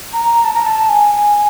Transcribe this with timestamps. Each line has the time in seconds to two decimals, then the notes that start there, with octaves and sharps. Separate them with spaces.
0.12 A#5
0.44 A5
0.54 A#5
0.64 A5
0.88 G#5